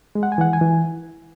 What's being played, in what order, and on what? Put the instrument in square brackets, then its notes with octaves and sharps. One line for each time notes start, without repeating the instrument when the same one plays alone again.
[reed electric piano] G#3
F#5
G#5
E3 F#5
G#5
E3